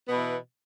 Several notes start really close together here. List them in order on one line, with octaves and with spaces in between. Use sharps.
B3 B2 E3